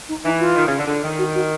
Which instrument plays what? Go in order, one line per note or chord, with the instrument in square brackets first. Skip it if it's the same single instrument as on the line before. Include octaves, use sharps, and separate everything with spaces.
[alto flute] D#4
[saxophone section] E3 [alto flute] D#4
[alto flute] F4
[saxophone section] D#3
C#3
D3
D3
D#3
[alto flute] F#4
F#4